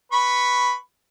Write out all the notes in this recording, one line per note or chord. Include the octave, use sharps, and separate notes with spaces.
B4 B5 C#6